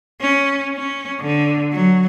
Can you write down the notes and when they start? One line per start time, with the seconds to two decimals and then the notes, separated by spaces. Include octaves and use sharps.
0.21 C#4
0.76 C#4
1.21 D3
1.73 F#3